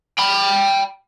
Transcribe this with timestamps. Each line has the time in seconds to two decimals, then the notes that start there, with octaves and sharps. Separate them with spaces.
0.18 G5 B5